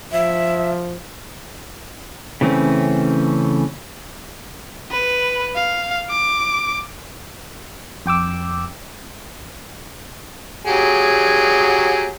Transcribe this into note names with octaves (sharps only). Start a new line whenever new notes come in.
F3 E5
C#3 E3 A3 C4 C#4
B4
F5
D6
F2 G5 D6 E6
F#3 G4 G#4